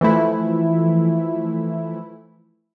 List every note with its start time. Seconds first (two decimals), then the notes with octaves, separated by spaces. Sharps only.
0.01 E3 F3 A3 E4